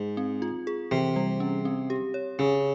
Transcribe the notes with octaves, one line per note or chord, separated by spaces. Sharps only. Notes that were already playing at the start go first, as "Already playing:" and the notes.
Already playing: G#2
C4
F4
G#4
C3 E3
G3
C#4
C4
G4
C#5
C#3 C#4